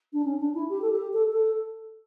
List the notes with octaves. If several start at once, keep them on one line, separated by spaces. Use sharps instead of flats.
D4
C#4
D4
E4
G4
A4
G4
A4
A4